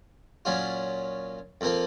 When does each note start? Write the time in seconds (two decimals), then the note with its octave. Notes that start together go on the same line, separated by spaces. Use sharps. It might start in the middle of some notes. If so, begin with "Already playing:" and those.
0.45 A#2 F#3 C#4 F4
1.61 F2 F3 A#3 F4